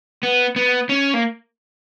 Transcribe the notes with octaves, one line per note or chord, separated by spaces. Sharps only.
B3
B3
C#4
A#3